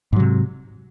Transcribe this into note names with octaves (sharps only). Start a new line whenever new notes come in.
G#2 C3 F#3